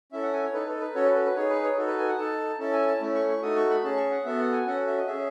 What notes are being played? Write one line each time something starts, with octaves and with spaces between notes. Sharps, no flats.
C#4 E4 A4 E5
F#5
G#5
C#5
D#4 A4 B4
A4
B4
C#4 F#4 A4 C#5
B4
B4
B4
D#4 G#4 C#5
B4
C#5
D#4 F#4 A4
B4
G#5
F#5
D#4 A4 A5
C#4 E4 A4 A5
G#5
A5
A3 C#4 E4
C#6
C#6
A3 D#4 F#4 A4 D#6
C#6
B5
C#4 G#4 A5
C#6
F#5
B3 F#4 A4 E5
F#5
G#5
C#4 F#4 A4 F#5
E5
D#5
C#4 G#4 E5